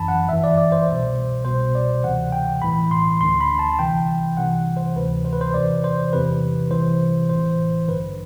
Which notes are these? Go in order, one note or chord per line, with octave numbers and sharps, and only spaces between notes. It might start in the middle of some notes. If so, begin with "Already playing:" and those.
Already playing: G1 F#2 E3 A5 B5
F#5
G1 G2 E3 E5
D5
D5
C5
C2
B2
C2 B2 C5
D5
D2 C3 E3 F#5
G5
B1 A2 E3 B5
C6
D2 D3 C6
B5
A5
A5
C2 C3 E3 G5
C2 C3 E3 F#5
C5
D2 C3 E3 B4
C5
B4
C5
E2 C3 E3 D5
C5
E2 C3 E3 B4
C2 C3 E3 C5
A1 A2 E3 C5
A1 G2 D3 B4